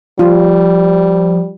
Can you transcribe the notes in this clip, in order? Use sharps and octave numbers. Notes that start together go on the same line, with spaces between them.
F3 G3 F4